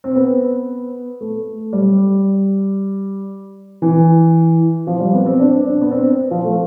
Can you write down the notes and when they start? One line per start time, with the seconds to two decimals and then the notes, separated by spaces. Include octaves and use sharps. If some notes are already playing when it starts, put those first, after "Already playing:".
0.04 C4
0.16 B3
1.21 A3
1.73 G3
3.82 E3
4.87 F3
5.00 G3
5.14 B3
5.26 C4
5.40 D4
5.65 D4
5.81 B3
5.92 C4
6.31 F3
6.44 A3